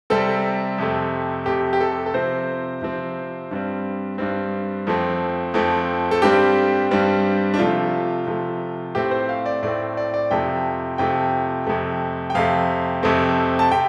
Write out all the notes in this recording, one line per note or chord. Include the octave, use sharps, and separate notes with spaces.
C3 G3 C4 A4
F2 C3 A3
F2 C3 A3 G4
G4
A4
A4
C3 F3 C4 C5
C3 F3 C4
G2 G3 C4
G2 G3 C4
F2 F3 A3 C4
F2 F3 A3 C4
A4
G2 G3 C4 G4
G2 G3 C4
D4
C3 F3 A3 F4
C3 F3 A3
A2 A3 C4 G4
C5
F5
D5
A2 A3 C4 D5
D5
D5
F2 C3 F3 A3 G5
F2 C3 F3 A3 G5
F2 C3 A3
G5
F2 C3 A3 F5
F2 C3 A3 C4
A5
C3 G5